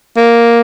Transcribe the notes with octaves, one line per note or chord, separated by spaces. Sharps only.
A#3